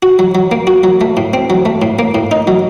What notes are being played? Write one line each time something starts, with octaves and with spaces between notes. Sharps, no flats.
F#4
F#3
F#3
A#3
F#4
F#3
A3
A2
C4
F#3
A3
A2
A#3
A2
D#4
F#3